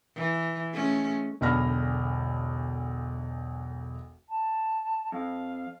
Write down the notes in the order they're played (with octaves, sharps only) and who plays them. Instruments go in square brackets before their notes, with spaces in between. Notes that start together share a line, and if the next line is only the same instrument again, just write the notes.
[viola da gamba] E3
G#3 A3 C#4
[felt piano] E1 B1 D3 B5 F6 A#6
[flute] A5
[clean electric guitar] F2 [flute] F5